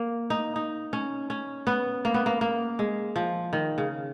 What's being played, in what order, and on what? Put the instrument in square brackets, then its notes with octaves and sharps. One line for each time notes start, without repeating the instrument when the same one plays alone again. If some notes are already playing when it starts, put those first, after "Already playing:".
Already playing: [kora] A#3
D#4
D#4
C#4
C#4
B3
A#3
B3
A#3
A#3
G#3
F3
D#3
C#3